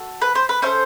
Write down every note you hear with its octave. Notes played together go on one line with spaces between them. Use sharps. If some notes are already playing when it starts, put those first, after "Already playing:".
Already playing: F#4 A4
B4
C5
B4
C#4 E4 A4 C5